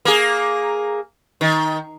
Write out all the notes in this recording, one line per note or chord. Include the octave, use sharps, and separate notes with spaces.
A#3 G#4
D#3